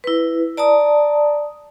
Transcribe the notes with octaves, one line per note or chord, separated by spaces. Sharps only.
E4 B4
D5 A5 A#5 D#6